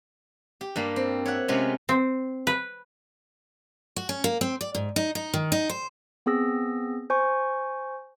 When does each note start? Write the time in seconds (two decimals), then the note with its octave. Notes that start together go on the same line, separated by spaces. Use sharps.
0.61 G4
0.76 G2 G3 A#3
0.96 C4
1.25 C#5 E5 F#5
1.48 C3 G#3 B3 C#4 F4 G4
1.89 C4
2.47 B4
3.96 F#4
4.09 C#4
4.24 A#3
4.41 C4
4.61 D5
4.75 G#2
4.96 D#4
5.15 D#4
5.34 D#3
5.52 D#4
5.69 C5
6.26 B3 C4 G#4 E6 A#6
7.10 C5 G#5 C#6